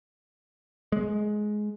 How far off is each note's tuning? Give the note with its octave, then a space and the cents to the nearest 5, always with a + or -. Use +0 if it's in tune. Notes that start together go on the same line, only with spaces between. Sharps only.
G#3 +15